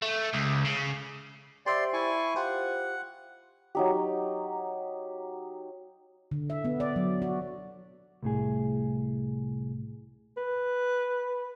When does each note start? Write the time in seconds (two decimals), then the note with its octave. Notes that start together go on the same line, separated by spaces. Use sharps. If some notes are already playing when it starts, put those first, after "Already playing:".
0.02 A3
0.34 C#2
0.65 C#3
1.66 G4 C5 D5 E5 C6
1.93 E4 G#5 C#6
2.36 F4 G4 C5 F#5
3.75 F#3 D#4 G4
6.31 D3
6.50 E5
6.65 B3
6.80 D5
6.96 F#3
7.22 F#4
8.23 C2 A2 G#4
10.37 B4